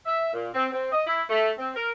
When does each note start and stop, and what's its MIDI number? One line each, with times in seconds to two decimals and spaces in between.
0.06 0.32 76
0.33 0.49 46
0.54 0.68 60
0.73 0.91 60
0.92 1.03 75
1.07 1.24 64
1.30 1.52 57
1.58 1.71 60
1.76 1.91 70